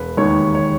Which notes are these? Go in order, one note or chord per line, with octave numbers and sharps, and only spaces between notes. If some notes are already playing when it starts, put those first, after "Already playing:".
Already playing: E1 B4
D#2 D#3 G#3 C#5
C#5